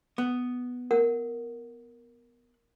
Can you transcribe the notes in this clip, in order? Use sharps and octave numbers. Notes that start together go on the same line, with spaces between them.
B3
A#4 F#5